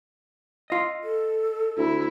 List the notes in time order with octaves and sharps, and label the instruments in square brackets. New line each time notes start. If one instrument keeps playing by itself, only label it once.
[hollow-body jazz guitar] F4 D#5
[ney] A4
[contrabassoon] D2 [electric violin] E4